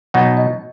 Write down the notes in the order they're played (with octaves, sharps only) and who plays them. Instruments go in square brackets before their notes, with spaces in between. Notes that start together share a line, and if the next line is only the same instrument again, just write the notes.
[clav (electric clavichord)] B2 F#3 B3 D#4 [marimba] F#5
[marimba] D#5